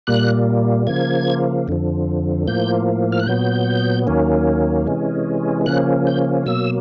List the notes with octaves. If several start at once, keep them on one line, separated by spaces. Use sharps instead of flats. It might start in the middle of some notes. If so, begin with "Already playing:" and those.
A#2 G3 A#3 F#6
C#3 F3 A#3 G#6
F2 D3 F3
A2 F3 A#3 G6
F6
F#6
A#2 F#3 B3 G6
D#2 D#3 F#3 A#3 C#4
C3 E3 G#3 C#4
C#3 F3 A#3 C#4 F#6
G6
B2 F#3 A#3 E6